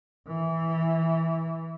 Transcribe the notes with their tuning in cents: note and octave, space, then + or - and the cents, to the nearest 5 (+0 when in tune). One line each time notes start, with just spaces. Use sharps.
E3 -10